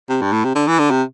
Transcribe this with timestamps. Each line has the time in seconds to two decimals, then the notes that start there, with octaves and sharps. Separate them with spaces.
0.09 C3
0.22 G2
0.33 A2
0.45 C3
0.55 D3
0.67 E3
0.79 D3
0.91 C3